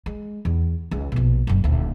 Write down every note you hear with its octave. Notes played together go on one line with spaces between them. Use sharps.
G#3
E2
C#2 G#3
A#1 B2
F#1 F#2
D#1 D2